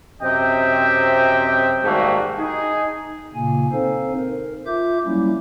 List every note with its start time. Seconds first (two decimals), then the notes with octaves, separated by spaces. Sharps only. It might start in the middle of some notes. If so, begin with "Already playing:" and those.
0.22 F#2 C3 C4 D#5 E5 G5
1.84 G#2 D#3 G3 A3 A#3 F#4
2.39 D#4 G#4
3.35 A#2 C#3 A#3 G#5
3.72 C4 D#4 A4 C5 F5
4.17 A#4
4.66 F4 E5 D6 G6
5.06 F#3 G3 A#3 C#4 E4